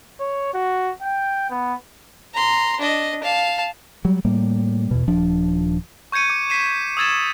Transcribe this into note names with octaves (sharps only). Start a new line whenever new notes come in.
C#5
F#4
G5
B3
A#5 C6
D4 D#5
F5 A5
F#3 G3
A2 G3 A#3
E2 B2
D#1 F3 D4
C#6 G6 G#6 C#7 D#7
D6
B6 C7 D#7 E7
D#6 E6 G#6 A6 E7